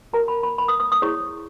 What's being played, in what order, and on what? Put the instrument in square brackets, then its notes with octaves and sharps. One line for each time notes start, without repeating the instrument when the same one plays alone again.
[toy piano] F#4 A#4 C#5 A#5
B5
B5
B5
D#6
D#6
D#6
E4 G#4 C#5 C#6